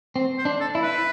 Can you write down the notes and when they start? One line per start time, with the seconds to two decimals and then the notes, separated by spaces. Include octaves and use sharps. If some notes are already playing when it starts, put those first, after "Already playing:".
0.16 C4
0.38 C5
0.45 D4
0.60 A4
0.75 E4
0.83 B4